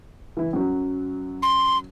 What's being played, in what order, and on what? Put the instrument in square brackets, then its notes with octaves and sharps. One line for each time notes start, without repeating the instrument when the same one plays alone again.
[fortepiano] E3 E4
F#2 F#3
[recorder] C6